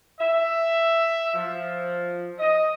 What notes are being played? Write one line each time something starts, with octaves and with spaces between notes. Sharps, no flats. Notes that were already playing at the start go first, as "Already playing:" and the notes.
E5
F3
D#5